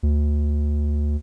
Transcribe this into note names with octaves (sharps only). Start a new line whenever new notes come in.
D2